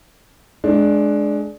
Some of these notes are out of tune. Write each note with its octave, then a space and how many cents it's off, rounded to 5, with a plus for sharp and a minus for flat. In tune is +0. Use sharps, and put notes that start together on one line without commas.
G#3 +20 D4 +0